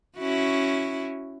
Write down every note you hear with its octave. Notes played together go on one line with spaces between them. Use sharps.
C#4 E4 F#4